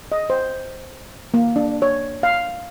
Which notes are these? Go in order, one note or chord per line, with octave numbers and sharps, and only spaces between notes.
D#5
C5
A#3
D4
C#5
F5